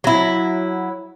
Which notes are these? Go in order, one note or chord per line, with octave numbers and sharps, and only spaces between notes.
F#3 E4